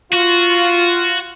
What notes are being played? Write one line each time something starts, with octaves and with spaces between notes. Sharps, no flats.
F4 F#4